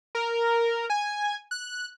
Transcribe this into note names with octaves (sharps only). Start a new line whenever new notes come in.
A#4
G#5
F#6